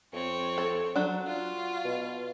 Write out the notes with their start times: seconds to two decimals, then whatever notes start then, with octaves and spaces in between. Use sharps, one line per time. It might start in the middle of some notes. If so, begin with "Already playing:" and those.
0.13 F2 C4 C#5
0.58 A4
0.96 F#3 D4 F#4
1.27 F4
1.85 B2